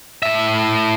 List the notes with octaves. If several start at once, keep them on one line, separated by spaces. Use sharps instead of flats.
A2 E5